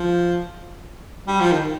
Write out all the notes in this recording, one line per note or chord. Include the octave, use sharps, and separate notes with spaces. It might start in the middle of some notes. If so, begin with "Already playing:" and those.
Already playing: F3
G3
F3
D#3